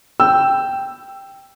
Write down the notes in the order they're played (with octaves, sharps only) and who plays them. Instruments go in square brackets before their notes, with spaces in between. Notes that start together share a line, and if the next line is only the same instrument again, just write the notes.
[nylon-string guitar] G5 [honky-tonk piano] E6